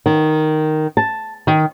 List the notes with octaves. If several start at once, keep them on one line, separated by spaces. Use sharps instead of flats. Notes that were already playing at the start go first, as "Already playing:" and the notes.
D#3
A5
D#3